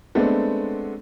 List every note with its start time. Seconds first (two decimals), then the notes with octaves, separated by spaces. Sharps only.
0.15 G#3 A3 B3 C4 D4